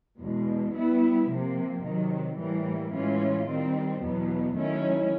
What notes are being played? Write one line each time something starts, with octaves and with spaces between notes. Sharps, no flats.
E2 B2 G#3
G3 B3 E4
C3 F3 A#3
C3 D#3 F#3
A2 E3 G3 A#3
A2 E3 G#3 C#4 F4
D#3 G3 C4
E2 B2 F#3 B3
D#3 F#3 A3 C#4 E4